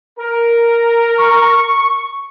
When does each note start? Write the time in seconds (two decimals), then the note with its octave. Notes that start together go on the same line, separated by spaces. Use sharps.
0.19 A#4
1.18 C#6